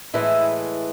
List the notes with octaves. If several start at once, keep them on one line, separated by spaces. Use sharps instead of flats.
A2 E3 G#3 E4